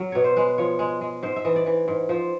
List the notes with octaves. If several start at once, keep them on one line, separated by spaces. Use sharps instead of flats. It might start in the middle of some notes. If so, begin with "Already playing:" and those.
Already playing: F#3 A#4
B2 C#5
C5
G#3 B4
F3 C#5
G#3
G#3
G#2 C5
E5
E3 D#5
D5
E3
G#2
F3 C5